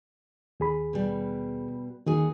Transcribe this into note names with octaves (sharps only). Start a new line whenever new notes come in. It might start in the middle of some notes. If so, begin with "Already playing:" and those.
D#2 G#4 B5
B2 G3
D#2 D#3 F#4 G#4